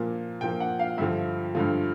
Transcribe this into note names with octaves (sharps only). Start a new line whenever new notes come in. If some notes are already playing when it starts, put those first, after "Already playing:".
Already playing: A#2 F3 A#3
A#2 F3 A#3 G5
F#5
F5
G2 D3 F3 E5
G2 D3 F3